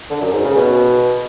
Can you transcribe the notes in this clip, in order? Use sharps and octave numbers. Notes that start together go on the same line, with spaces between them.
D3
F#2
G#2
C#3
B2